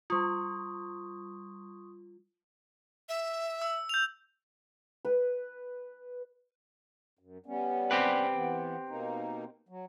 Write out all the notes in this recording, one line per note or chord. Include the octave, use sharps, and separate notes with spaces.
G3 F4 C6 C#6 D#6
E5
E6
G6 F7
B4
F#2
G3 B3 C#4
C4 G4 B4
E3 B3
B2 A#3 D#4
F#3